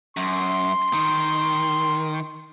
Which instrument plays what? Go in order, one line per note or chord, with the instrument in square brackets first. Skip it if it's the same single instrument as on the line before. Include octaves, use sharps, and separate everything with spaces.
[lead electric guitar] F#2 [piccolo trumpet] C6
[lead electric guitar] D#3